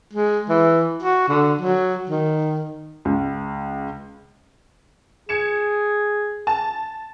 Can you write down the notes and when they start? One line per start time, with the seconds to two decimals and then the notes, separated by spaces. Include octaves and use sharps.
0.13 G#3
0.49 E3
1.02 F#4
1.28 D3
1.61 F#3
2.09 D#3
3.05 C#2
5.29 G#4 G#6 C#7 E7
6.47 A5